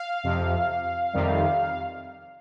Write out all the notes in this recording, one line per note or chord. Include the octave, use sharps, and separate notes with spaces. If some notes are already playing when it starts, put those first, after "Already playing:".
Already playing: F5
F2 C3 F3
F2 C3 D#3 G3